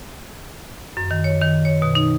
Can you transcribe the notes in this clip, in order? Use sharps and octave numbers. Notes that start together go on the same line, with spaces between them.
F#2
D#3
C#5
D#3
C#5
B2
D#4